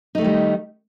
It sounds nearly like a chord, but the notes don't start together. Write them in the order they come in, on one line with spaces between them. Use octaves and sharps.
D#4 A3 D#3 G3